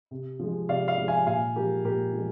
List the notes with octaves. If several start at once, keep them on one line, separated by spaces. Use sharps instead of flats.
C3
F3 G#3
C3 D5 F5
D5 F5
F3 G#3
F5 G#5
A#2 F5 G#5
F3 G#3 G4 A#4
A#2 G4 A#4
F3 G#3